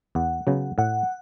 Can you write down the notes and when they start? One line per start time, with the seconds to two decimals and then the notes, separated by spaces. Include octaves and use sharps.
0.15 E2 F#5
0.47 C#3 F#3 B3
0.78 A2 F#5